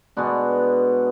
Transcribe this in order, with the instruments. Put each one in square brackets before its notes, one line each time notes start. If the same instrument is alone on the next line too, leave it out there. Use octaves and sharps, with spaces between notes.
[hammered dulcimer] B2 G#3 B3 D4 F#4